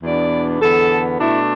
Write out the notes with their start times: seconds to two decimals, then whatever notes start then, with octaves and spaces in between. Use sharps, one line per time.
0.03 E2 B2 B3 D4 D5
0.61 E2 D3 B3 A4
1.19 B2 A3 D4 E4